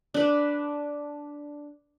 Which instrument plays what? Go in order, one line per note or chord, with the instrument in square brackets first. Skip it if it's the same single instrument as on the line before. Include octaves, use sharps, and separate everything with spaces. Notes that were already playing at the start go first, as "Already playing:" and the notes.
[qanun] D4 B4